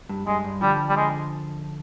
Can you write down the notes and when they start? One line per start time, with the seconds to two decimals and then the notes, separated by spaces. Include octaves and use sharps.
0.09 G2
0.27 G2 G#3
0.44 G2
0.61 D3 F3 G3
0.89 G3
0.96 G#3